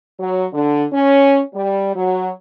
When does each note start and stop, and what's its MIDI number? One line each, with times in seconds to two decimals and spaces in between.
0.20 0.46 54
0.53 0.84 50
0.93 1.41 61
1.55 1.94 55
1.95 2.31 54